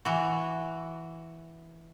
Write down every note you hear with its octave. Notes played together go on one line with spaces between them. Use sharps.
E3 F#4